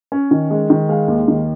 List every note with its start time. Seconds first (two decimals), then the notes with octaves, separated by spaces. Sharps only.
0.12 C#4
0.31 D#3
0.51 G#3
0.70 D#3
0.89 G#3 F5
1.08 D#2
1.28 D#3